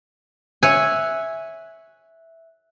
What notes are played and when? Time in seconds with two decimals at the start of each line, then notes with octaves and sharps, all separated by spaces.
0.63 C#5 E5 G#5 E6 F#6